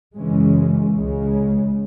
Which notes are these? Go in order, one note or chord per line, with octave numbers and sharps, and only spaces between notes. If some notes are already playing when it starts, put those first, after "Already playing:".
F#2 C#3 E3 G#3 C#4
C#2 C#3 G#3